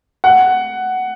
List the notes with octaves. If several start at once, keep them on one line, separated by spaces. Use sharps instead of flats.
F#5